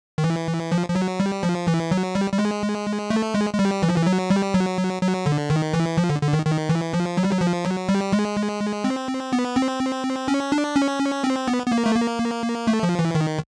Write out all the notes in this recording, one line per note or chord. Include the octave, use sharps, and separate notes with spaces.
D#3
E3
F3
F3
F#3
G3
F3
E3
F#3
G3
G3
G#3
A3
G#3
G#3
G3
E3
F3
E3
F#3
G3
F#3
F#3
D3
D#3
E3
F3
D3
D3
D#3
D#3
E3
F3
F#3
G3
F#3
F3
F#3
G3
G#3
C4
B3
C4
C#4
D4
C#4
C4
B3
B3
A#3
A3
A#3
A3
F3
E3
D#3